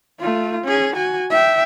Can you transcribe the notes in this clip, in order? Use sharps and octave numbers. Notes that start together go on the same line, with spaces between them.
A3 F4
C#4 G#4
F#4 G#5
E5 G5